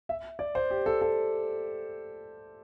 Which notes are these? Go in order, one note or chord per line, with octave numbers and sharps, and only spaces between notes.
E5
D5
C5
G4
A4
A4